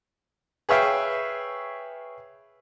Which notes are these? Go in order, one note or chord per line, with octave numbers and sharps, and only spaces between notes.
G#4 B4 C#5 E5 F5 G5